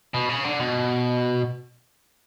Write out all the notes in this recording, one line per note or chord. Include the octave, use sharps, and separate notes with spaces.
B2
C#3
D3
B2